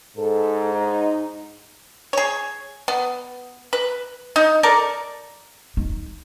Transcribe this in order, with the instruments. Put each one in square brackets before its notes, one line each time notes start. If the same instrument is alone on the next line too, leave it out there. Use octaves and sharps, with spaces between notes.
[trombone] G#2 [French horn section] A4
[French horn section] D#4
[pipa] G#4 C#5
B3
B4
D#4
A4 A#4 D5
[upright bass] D#4